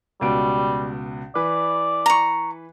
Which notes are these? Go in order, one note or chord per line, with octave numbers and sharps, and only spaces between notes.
C#2 B2 G3 D7
E3 B4 D5
A#5 C#6